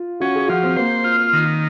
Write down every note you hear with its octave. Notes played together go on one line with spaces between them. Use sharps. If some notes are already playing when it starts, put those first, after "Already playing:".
Already playing: F4
C#4 F#4
G#4
F3 F#4
C4
A#3 C5
F4
D#3